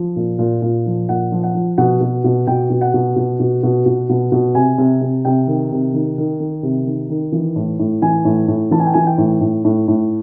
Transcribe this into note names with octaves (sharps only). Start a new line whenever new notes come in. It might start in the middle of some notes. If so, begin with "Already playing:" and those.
Already playing: F3
A#2
A#2
A#2
F3
A#2 F#5
F3
F#5
F3
B2 F#5
B2
B2
B2 G5
B2
F#5
B2
B2
B2
B2
B2
B2
B2
C3 G#5
C3
C3
C3 G5
D#3
C3
D#3
D#3
D#3
C3
D#3
D#3
E3
A2
A2
E3 G#5
A2
A2
E3 A5
G#5
G5
E3 G#5
G5
A2
A2
A2
A2